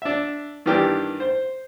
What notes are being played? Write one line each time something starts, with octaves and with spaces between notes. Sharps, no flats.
D4 E5
G2 D#3 E3 D4 G4 A#4
C5